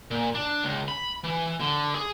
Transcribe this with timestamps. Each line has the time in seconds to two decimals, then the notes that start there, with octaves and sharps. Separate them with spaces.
0.11 A#2
0.35 D4
0.64 C#2
0.88 B5
1.24 E3
1.60 D3
1.95 G#4